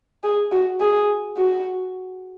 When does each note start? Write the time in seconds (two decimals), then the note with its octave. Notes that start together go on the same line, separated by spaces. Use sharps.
0.24 G#4
0.52 F#4
0.81 G#4
1.37 F#4